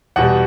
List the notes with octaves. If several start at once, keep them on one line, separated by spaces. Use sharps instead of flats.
E2 B2 G3 F#5